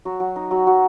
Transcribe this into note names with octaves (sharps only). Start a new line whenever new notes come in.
F#3 F#4
F#3 F#4
D#4
F#3 F#4
F#3 F#4